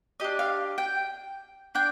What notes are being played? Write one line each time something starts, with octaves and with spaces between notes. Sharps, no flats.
D4 G4 D#5
F5
G5
D4 G5